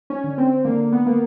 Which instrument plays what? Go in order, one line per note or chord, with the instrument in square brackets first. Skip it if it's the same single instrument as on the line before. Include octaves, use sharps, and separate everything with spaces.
[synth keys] C#4
D3
C4
D3 A#3
B3
A#3